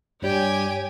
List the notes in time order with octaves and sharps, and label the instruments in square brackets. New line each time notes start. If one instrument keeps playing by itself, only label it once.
[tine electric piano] G2 G3 [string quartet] G4 G5 G#5 [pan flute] C#5